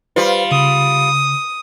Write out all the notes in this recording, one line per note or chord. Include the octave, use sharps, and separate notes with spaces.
G3 F4 B4 C5
C#3 D#6